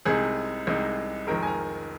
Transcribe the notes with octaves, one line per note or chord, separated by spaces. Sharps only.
C2 C3 G#3 D#4 G#4
C2 C3 G#3 D#4
F1 F2 D#3 G#3 A#4
G#5
A#5